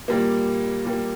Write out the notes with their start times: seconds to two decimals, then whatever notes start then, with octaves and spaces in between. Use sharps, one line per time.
0.08 A#2 G3 A#3
0.85 A#2 G3 A#3